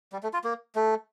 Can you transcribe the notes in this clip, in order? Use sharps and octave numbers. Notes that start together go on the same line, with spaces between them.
G3
A3
F4
A#3
A3